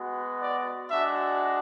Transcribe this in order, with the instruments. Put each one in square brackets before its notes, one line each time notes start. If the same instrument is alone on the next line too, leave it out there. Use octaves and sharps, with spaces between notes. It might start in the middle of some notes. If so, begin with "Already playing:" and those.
Already playing: [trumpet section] G#3 B3 F#4
D5
G#3 D4 F#4 E5